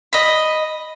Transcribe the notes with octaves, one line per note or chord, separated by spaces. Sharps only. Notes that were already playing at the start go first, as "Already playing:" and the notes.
D#5 B5